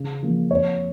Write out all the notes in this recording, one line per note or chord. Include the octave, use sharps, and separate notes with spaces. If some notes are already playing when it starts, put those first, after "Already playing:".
Already playing: C#3
F3 A#3
F2 C#5